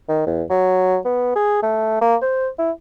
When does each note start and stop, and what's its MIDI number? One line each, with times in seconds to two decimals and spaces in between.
0.09 0.24 51
0.27 0.43 40
0.50 0.97 54
1.05 1.32 59
1.36 1.61 68
1.63 2.01 57
2.01 2.16 58
2.22 2.48 72
2.59 2.71 64